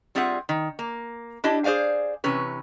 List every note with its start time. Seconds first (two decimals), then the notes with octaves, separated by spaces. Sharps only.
0.15 G3 C4 F4 G#4 E5 F#5
0.49 D#3
0.79 A#3
1.44 D4 E4 G4 D#5 A5
1.64 G#4 C5 D5 F5 G#5
2.24 C3 E3 C#4 B4